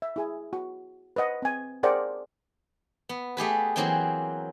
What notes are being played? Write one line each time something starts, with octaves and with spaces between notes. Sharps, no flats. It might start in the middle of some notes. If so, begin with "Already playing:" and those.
E5
E4 G#4 G#5
F#4
B4 C5 D#5 F#5
C4 G#5
G#4 A#4 C5 D5 F#5 G5
B3
A3 G4 G#4 B4
E3 F#3 A#3 C4 G#4 G5